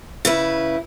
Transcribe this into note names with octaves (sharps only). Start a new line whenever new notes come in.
C#3 E4 B4